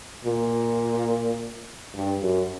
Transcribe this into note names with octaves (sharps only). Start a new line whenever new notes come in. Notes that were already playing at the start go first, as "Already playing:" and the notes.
A#2
G2
F#2